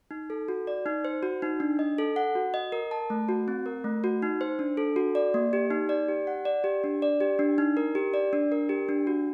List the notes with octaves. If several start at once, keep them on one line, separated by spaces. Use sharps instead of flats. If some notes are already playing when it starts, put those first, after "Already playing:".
D#4
A4
F#4
D5
D#4
C5
F#4
D#4
D4
D#5
A4
F#5
F#4
D#5
A#4
A5
A3
F#4
C4
A#4
A3
F#4
D#4
C5
D4
A4
F#4
D5
A#3
G4
D#4
D5
G4
F#5
D5
G4
D4
D5
G4
D4
D#4
A#4
G4
D5
D4
A#4
G4
D4
F#4